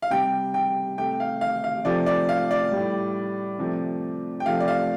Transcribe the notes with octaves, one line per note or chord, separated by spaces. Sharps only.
F5
C3 G3 G5
G5
C3 A3 G5
F5
F5
F5
C3 F3 A3 D5
D5
F5
D5
A2 G3
C3 F3 A3
G5
C3 F3 A3 F5
D5
F5